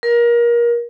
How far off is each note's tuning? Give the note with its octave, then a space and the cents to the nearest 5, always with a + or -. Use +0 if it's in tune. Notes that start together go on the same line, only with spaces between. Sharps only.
A#4 +25